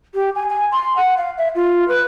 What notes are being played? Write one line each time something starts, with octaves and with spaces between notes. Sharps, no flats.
G4
G#5
G#5
C6
F#5
F5
E5
F4
B4